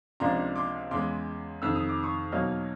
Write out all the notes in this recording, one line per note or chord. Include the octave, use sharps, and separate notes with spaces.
C#2 C3 F3 A#3 D4 A#5 C6
C6 D6
E2 C#3 E3 G#3 C6 D6
F2 C3 D#3 E6
D#6
D6
C#6 D#6
E2 B2 F#3 A#3 D#4 D#6 F6